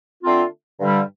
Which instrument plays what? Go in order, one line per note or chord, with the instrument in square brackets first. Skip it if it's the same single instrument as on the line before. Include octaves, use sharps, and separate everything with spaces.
[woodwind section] D3 A3 C4 F4
G2 D3 G3